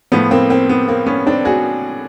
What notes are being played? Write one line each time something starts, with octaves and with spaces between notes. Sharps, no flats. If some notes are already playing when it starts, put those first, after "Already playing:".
A2 F3 B3
A#3 C4
A#3 C4
B3
A#3 C4
B3 C#4
C4 D4
F#4 G#4